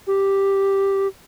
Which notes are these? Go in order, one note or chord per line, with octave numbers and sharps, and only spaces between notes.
G4